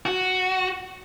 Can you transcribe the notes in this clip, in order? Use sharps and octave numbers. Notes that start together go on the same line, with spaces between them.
F#4